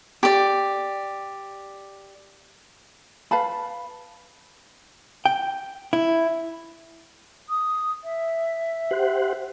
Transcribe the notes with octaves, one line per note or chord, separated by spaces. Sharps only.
G4 D5
B4 F5 A5 B5
G5
E4
D#6
E5
G4 C5 F#5